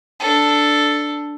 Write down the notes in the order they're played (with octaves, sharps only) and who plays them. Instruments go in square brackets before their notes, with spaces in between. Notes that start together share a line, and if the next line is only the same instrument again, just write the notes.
[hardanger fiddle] D4 A4